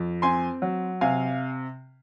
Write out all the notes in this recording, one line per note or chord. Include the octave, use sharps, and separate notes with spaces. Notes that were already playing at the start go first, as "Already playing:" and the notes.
Already playing: F2
C4 G#5 C6
F#3
C3 F5 G#5